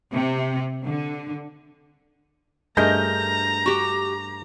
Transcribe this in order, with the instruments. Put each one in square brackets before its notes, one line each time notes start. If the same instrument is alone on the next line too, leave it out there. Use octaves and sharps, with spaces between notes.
[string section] C3
D3
[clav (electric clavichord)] G2 A3 G#4 [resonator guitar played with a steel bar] A#4 D#5 [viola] A#5 [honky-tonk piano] G6 A#6
[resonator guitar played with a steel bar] F#4 G4